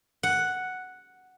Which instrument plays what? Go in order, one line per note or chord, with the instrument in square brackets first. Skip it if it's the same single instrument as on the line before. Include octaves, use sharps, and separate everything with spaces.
[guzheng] F#5